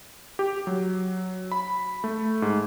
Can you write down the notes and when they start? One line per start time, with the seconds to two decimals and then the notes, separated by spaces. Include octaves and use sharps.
0.39 G4
0.67 F#3
1.52 B5
2.04 A3
2.42 G#2